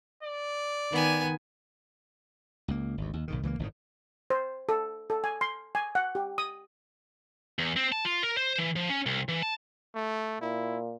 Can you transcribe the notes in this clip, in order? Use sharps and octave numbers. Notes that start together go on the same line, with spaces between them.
D5
D#3 B3 G#5
C#2 A#3
G#1 D2
D#2
B1 G#2 D#3
C#2 E3 A3 A#3
G1 A2 D#3
C5
A4
A4
G#5
C6
G#5
F#5
G4
D#6
E2
C4
A5
F4
A#4
C5
E3
F3
C#4
C2
E3
A5
A3
A#2 E4